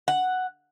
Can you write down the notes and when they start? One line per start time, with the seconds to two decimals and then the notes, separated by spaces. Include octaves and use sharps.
0.08 F#5